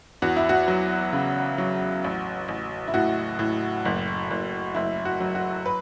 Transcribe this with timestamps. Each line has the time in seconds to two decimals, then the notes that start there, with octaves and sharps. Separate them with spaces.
0.22 E2 F#4
0.36 E4
0.49 F#4
0.68 F#3
1.13 C#3
1.58 F#3
2.04 A1
2.48 A1
2.87 E4
2.94 A2 F#4
3.39 A2
3.85 F#1
4.31 F#1
4.75 F#1 E4
5.05 F#4
5.20 F#3
5.35 F#4
5.66 B4